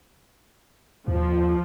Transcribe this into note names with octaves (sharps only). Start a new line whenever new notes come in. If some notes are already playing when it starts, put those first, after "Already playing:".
D#2 F3